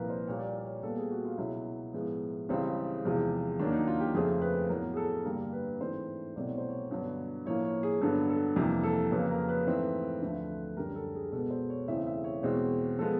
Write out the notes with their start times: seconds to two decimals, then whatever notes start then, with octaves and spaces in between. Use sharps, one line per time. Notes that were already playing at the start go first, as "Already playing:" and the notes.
Already playing: C2 A#2 F3 A#4 B4
0.10 C5
0.27 A#2 G3 A#3 C#5
0.39 D5
0.46 C#5
0.57 D5
0.65 C#5
0.83 A#2 G3 B3 A4
0.97 G#4
1.11 F#4
1.25 F4
1.38 C#2 B2 F#3 E4
1.93 A2 F3 G#3 B3
2.49 C#2 C#3 E3 G3 C4
3.05 E2 C3 F3 G#3
3.59 D#2 D#3 F#3 A#3 D4
3.73 D#4
3.88 F4
4.00 G4
4.14 F2 C#3 F3 A3 C4 G#4
4.42 B4
4.69 A2 F#3 B3 A#4
4.94 G#4
4.97 A4
5.25 G2 D3 G3 A#3 A#4
5.53 B4
5.81 G#2 E3 A3 C4 C5
6.36 C2 B2 F#3 A3 C4 D5
6.46 C#5
6.58 C5
6.69 C#5
6.91 G2 D3 F#3 B3
7.45 A2 F3 A#3 C#5
7.65 C#5
7.83 G#4
8.02 G2 D3 F#3 B3 A4
8.29 A4
8.56 F2 C3 E3 G3 A#3 G4
8.83 A4
9.11 F2 C#3 F#3 A#3 B4
9.31 A#4
9.49 B4
9.67 G#2 E3 A3 C4
10.22 D2 D3 F3 A3
10.77 F#2 D3 G3 A#4
10.95 A4
11.15 G#4
11.32 B2 G#3 B3 A4
11.51 C5
11.70 C#5
11.88 E2 C#3 E3 A3 C4 E5
12.07 E5
12.24 C#5
12.43 E2 B2 G#3 C4
12.99 F3 G#3 B3 A4